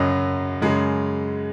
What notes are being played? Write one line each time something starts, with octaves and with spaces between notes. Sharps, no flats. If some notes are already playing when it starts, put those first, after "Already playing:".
Already playing: F#2 C#3 F#3 D#5
F#2 C#3 G#3